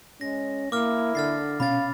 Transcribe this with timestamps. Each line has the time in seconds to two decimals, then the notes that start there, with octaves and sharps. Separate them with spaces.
0.21 G#3 C#4 A#6
0.72 A#3 E4 D6 F6
1.15 D3 F6 A6 C7
1.60 B2 C#4 F5 B5 A6